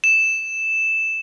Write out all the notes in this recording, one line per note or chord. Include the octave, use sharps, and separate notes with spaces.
E7